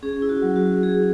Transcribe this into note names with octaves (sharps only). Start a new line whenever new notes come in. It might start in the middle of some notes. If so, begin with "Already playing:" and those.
C#4 G#4
E4
F#4
F#3
F#4
F#3
C#4 G#4